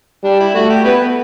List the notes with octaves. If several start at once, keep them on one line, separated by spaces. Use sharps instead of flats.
G3 D4
E4
A3 F#4
G4
B3 E4 G4 B4